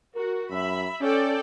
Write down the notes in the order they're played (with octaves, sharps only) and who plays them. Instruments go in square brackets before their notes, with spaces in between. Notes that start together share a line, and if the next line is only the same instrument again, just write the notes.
[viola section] F#4 [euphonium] A#4
[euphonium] F#2 [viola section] E5 B5
[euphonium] C#4 [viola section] A4 D5 G5